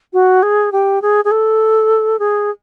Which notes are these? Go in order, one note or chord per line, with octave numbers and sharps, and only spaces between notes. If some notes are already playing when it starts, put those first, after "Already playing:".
F#4
G#4
G4
G#4
G#4
A4
G#4